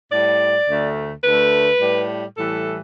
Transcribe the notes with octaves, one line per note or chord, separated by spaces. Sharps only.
A2 G3 D5
D2 D3 A3
D2 D3 A3 B4
A2 G3
A2 E3 G3 A4